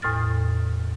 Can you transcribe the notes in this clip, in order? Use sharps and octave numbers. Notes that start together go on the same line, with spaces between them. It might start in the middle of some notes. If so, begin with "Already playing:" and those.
E2 A2 D#6 F6 A6